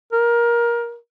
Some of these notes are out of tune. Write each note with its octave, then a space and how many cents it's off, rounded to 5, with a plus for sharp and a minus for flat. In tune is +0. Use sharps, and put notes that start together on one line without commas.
A#4 +20